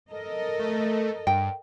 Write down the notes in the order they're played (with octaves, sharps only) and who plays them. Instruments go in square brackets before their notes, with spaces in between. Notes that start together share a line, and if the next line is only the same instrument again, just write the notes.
[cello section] A4 A#4 D#5
[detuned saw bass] A3
[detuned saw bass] G2 [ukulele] G5